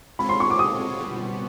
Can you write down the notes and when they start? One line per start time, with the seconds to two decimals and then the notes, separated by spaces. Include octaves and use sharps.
0.19 G#3 C4 F4 A4 C#5 B5
0.29 C6
0.40 C#6
0.50 D6
0.59 D#6
1.00 B2 G3 B3